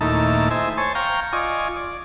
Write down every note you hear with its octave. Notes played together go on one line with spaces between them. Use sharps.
D#2 A#2 A3 D#4 E4 A5
C5 D#5 E5 G#5
C5 C#5 G#5 A5
F5 G5 A#5 C#6
F4 D5 D#5 G#5 C#6
D5